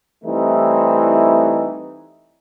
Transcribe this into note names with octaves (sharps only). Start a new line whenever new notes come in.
E3 G3 A3 C4 D#4 E4